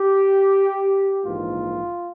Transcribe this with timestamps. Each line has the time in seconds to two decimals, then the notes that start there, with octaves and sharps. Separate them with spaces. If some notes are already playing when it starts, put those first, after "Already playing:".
Already playing: G4
1.24 A#1 G#2 E3 A#3 F4